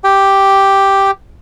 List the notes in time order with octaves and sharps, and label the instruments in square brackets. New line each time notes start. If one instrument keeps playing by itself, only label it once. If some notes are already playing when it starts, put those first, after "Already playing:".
[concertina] G4 G5